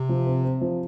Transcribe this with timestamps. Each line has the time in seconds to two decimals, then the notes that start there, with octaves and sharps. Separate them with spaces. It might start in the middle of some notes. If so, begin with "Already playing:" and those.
Already playing: C3
0.09 F3
0.27 C4
0.44 C4
0.61 F3